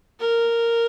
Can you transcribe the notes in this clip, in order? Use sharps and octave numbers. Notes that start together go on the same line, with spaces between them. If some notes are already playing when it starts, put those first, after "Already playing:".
A#4